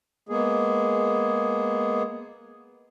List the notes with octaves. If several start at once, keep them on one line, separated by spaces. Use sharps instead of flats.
G#3 A#3 B3 G#4